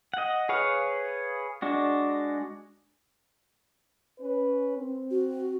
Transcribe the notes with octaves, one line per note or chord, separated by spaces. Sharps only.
D#5 F#5
G#4 B4 C#5 F5
G#3 D4 F#4
C#4 B4
C4
F#4